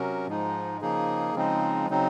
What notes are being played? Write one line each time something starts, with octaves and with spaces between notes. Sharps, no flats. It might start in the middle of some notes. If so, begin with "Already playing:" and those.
Already playing: C3 F#3 C#4 F#4 A#4
G#2 F3 G#3 D#4
C#3 F3 A#3 D#4 G#4
C#3 F3 G#3 C4 D#4
C#3 F#3 C4 D#4